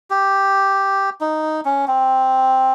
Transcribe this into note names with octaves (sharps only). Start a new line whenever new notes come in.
G4
D#4
C#4
C4